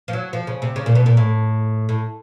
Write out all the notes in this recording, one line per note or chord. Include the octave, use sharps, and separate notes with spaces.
F3
F#3
F3
C#3
C3
C#3
A#2
B2
A#2
A2
A2